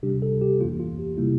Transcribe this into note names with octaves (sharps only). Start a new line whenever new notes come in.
C3 G3 D4 G4
A4
G4
F2 E3 A#3 F4
F4
G4
C3 G3 A#3 E4